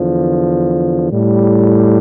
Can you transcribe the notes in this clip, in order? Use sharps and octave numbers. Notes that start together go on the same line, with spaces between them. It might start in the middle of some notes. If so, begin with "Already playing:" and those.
Already playing: E2 D3 F3
A2 G3